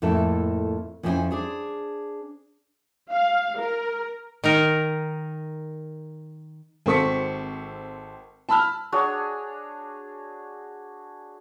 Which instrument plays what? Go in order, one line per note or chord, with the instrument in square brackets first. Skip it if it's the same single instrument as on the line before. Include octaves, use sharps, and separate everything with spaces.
[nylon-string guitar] F2 A2 A3 A#3 E4 A4
F2 C#4 E4 G4 C5 G#5
D4 G#4 C5
[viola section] F5
A#4
[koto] D#3 D#4 A#4
[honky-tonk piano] G#1 C4 A4 C#6 B6 C#7
A5 B5 E6 F6
[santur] D4 F#4 G#4 C#5